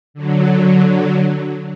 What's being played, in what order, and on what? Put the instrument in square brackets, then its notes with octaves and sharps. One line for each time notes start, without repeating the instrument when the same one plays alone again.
[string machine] D3 F#3